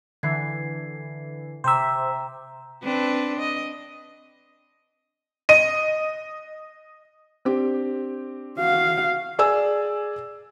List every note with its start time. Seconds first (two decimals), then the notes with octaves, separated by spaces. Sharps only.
0.23 D3 E3 G#6 C7
1.64 C3 C5 E5 G5 A#5 D6
2.83 C4 D4 B4
3.39 D#5
5.49 D#5 D#7
7.45 C4 D4 G4
8.58 F#4 F5
9.39 G#4 D5 G#5 E6